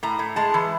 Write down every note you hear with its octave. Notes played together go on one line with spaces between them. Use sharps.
A2 A#5
A2
G#3 A5
E3